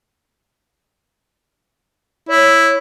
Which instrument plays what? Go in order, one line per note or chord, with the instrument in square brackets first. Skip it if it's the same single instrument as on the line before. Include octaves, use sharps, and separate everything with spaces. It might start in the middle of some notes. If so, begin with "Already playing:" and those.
[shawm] E4 [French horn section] C#5